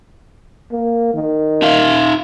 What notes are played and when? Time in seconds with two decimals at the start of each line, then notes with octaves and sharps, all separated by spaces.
0.72 A#3
1.14 D#3
1.62 D#4 E5 F5